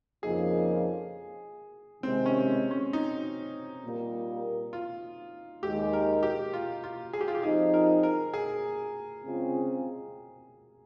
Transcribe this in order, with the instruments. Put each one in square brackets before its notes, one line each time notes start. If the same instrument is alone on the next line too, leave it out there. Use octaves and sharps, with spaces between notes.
[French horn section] F2 C#3 F3 A#3 D#4 [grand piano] G#4
[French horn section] C3 D#3 G#3 [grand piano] C4
[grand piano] C#4
C#4
D#4
[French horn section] A#2 G3 A#3
[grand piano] F4
[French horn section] D#2 D#3 G#3 [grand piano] G4
[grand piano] A#4
G4
F4
F4
G#4
G4
F4
G4
[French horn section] F3 C4 D#4 [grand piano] G#4
[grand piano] A#4
A#4
G#4
[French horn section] C#3 G#3 C4 F4